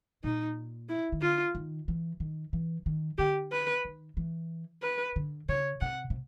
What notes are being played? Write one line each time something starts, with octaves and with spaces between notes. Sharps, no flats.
A#2 D#4
E4
D#3
D3 F4
D#3
E3
D#3
E3
D#3
D3 G4
B4
D#3
E3
B4
D3
C#3 C#5
C3 F#5
C3